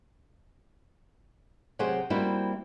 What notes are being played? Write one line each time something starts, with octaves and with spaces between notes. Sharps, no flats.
C3 F#3 G4 G#4 C5 F#5
G3 A#3 C4 E4 F#4